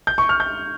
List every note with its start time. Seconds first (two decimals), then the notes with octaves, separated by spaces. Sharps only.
0.07 G6
0.18 C#6
0.29 F6
0.40 G6